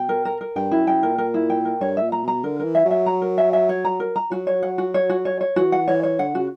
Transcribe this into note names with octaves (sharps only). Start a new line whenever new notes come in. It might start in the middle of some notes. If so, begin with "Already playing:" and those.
Already playing: B2 G5
A#4
A#4
A#4
G2 G5
F#2 E4
F#2 G5
A#2 A#4
A#4
E4
G5
A#4
G2 C#5
E5
A#2
A#5
B2 A#5
D3 A#4
E3 A#4
E5
F#3
E5
A#5
A#4
E5
E5
C#5
A#5
A#4
A#5
F#3 F#4
C#5
F#5
F#4
C#5
F#4
C#5
C#5
E3 F#4
F#5
E3 C#5
C#5
D3 F#5
C#3 F#4